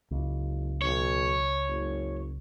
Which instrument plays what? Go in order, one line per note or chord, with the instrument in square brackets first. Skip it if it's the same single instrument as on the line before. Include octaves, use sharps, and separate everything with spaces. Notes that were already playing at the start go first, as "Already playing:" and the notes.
[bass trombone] F#1 [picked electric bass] C#2
[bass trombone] B1 [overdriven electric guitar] C#5
[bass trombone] F#1